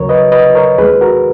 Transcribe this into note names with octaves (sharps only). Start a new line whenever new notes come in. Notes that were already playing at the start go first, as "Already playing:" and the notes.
Already playing: D#2 C#3 F#3 A#4 C#5
B4 D#5
B4 D#5
A#4 C#5
D#2 D#3 G#3 G#4 B4
F#4 A#4